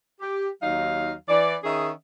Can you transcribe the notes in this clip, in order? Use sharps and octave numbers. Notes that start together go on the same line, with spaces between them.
G4
D#2 F#3 D#4 F5
E3 D5
D#3 C#4 G#4 D#5 E5